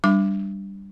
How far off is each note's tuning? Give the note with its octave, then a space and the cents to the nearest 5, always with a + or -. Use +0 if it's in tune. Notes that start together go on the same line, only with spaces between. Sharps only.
G3 +0 D4 +0 D6 +0